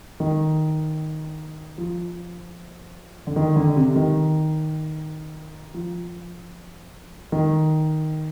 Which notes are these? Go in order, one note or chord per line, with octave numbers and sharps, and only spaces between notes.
D#3
F3
D3
D#3
D3
C3
D#3
F3
D#3